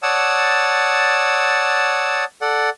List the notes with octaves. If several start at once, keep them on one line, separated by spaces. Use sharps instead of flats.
C#5 D5 F#5 A5 D#6 E6
A4 D5 F#5